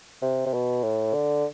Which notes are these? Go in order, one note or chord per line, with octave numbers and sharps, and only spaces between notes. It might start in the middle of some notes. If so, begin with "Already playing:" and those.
C3
C3
B2
A2
D3